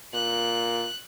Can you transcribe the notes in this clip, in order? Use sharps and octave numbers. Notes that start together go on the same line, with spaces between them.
A#2 F#6